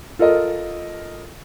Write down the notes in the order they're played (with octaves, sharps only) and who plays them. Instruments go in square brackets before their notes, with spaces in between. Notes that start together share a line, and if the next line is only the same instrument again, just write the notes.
[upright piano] F4 A4 A#4 D#5